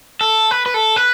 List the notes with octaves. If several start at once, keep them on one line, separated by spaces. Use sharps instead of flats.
A4
B4
B4
A4
B4